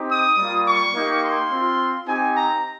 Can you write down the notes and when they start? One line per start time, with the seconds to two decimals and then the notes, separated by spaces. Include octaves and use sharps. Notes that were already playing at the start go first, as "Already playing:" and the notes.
Already playing: C4 D#4 G4
0.09 D#6
0.38 G3 A#3 F4
0.66 C#6
0.94 A#3 D#4 G4
1.22 C6
1.51 C4 F4
2.06 C4 D#4 G4 G#5
2.35 A#5